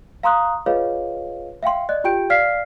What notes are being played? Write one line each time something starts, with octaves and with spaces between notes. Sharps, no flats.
F5 A#5 C6 D#6 F#6
F4 G#4 B4 C#5 D#5 F5
E5 F5 G5 C6
D5 D#5 F#6
F4 G4 G5 G6 D7
D5 F5 F6 B6 C7